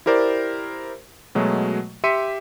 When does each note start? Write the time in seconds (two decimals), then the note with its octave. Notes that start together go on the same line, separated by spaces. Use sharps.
0.06 E4 G4 A#4 C5 D5
1.35 B2 F#3 G#3 A3
2.04 G4 E5 C6 B6 C#7 D#7